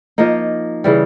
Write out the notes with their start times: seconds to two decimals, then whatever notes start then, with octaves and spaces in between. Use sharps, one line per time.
0.18 F3 A#3 D#4
0.84 C#3 E3 G3